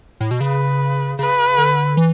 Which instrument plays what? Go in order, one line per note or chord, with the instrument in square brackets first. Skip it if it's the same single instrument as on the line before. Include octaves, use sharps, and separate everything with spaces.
[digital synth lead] A2
B2
[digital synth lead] C#3 [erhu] B4
[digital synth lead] C#3 [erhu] B4
[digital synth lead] D3
E3